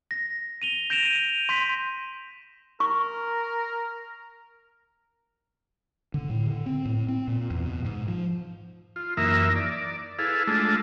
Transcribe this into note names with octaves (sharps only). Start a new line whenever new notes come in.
A#6
D#7 F7 G7
G6 A#6 D7 E7 F7
D#7
C6 G6 B6
A#4 C#6
D3
A2
D3
C4
A2
C4
A#2
E2
B2
G#2
F3
F4
F#2 E3 A#3 D#4 A#4 E5
D5
E4 G#4 A4 B4 F5
G#3 A3 D4 F4 A4